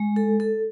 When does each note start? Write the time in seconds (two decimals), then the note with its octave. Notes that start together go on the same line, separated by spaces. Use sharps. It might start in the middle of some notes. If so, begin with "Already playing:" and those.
Already playing: G#3
0.16 A4
0.40 A4